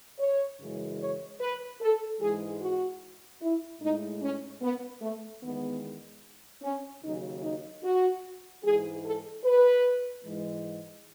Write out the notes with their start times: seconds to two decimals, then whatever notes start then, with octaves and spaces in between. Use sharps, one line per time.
0.19 C#5
0.60 F#2 C#3 E3 G#3
1.00 C#5
1.41 B4
1.81 A4
2.21 G#2 E3 G#3 G#4
2.61 F#4
3.41 E4
3.81 A2 G#3 D#4
4.22 C#4
4.62 B3
5.01 A3
5.42 E2 D#3 G#3 B3
6.63 C#4
7.03 D#2 C#3 F#3 D#4
7.43 D#4
7.84 F#4
8.64 G#2 E3 G#3 G#4
9.04 A4
9.44 B4
10.24 G#2 E3 G#3